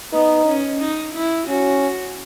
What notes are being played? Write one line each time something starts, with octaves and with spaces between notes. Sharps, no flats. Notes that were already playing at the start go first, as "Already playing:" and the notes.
B3 D#4
C#4
D#4
E4
C#4 F#4